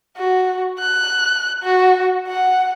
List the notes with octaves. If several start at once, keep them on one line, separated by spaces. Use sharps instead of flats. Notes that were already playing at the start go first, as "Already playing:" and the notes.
F#4
F#6
F#4
F#5